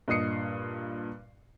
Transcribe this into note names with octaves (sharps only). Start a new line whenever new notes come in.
G2 A#2 D#5 D#6 C7 C#7